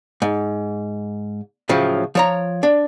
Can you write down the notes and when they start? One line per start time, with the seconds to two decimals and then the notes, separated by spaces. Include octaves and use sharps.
0.22 G#2
1.69 A2 C#3 F3 F#3
2.15 F3 C#5 A#5
2.63 D4